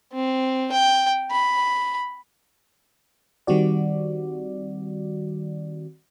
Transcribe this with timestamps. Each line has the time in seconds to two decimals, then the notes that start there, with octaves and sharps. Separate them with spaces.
0.13 C4
0.72 G5
1.31 B5
3.47 D#3 G3 C4 F#4 D5